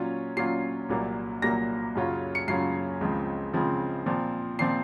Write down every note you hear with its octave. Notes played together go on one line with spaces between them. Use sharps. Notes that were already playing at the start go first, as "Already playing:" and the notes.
Already playing: A#2 F#3 C#4 F4
A#2 F#3 C#4 F4 C7
C2 A#2 F#3 A#3
C2 A#2 F#3 A#3 A#6
F#2 C#3 F#3 C#4 F4
C#7
F#2 C#3 F#3 C#4 F4 C7
C#2 C#3 F3 C4
C#2 C#3 F3 C4
A#2 F3 C4
A#2 F3 C4 C7